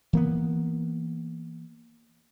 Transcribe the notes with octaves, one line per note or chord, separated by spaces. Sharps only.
E3 A#3 B3